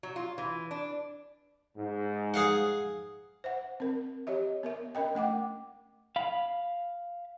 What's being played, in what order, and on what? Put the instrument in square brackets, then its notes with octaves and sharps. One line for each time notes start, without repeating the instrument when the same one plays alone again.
[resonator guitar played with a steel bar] F#3
F4
E3
D4
[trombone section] G#2
[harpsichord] G#4 F5 F#5
[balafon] C5 E5 F#5
C4 A#4
G4 C#5 D#5 E5
B3 A#4 E5
C#4 A#4 D#5 G5
A3 F#5 G5 D6
[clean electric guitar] F5 B5